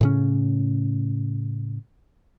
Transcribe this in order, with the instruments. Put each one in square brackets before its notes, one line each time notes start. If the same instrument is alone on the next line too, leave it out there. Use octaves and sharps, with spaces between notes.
[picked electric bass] A2 C#3 C#4